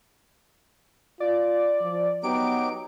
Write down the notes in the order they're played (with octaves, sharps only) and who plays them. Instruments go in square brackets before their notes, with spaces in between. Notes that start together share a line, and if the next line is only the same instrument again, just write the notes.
[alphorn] F4 [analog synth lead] D5
[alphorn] F3
[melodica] F#3 D#4 G4 [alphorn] B3 [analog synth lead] D7